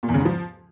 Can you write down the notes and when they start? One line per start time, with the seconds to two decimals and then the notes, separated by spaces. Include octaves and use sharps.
0.03 A#2
0.08 E2
0.14 C#3
0.20 G#2
0.25 F3